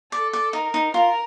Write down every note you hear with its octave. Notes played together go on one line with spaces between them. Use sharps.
A4 D5
D5
D#4 A#4
D#4
F4 A#4